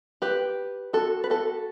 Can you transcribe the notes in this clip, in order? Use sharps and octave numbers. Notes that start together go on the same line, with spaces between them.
G4 B4
F#4 A4
B4
F#4 A4